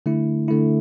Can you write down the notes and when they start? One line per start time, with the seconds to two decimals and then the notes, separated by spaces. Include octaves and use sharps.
0.06 D3 A3 E4
0.48 D3 A3 E4